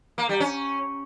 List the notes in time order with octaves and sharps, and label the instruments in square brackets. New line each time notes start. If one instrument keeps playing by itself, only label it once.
[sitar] A#3
G3
C#4